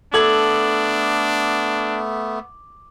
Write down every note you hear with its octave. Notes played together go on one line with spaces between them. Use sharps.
A3 B3 D4 A4 D6 G#6 F#7